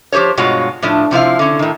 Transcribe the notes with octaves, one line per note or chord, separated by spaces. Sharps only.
F3 G4 G#4 C5 C#5
G2 B2 G#3 F4 F#4 C#5
A2 F3 D4
C3 F3 E4 F5
D3 C#4
A2 D#3